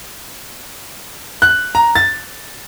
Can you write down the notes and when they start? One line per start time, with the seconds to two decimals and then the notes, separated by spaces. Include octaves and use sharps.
1.42 F#6
1.75 A#5
1.95 A6